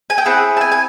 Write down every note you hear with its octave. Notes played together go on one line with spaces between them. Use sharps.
G#5
G5
C4 E4 G#4 F#5
A5
G#5
G#5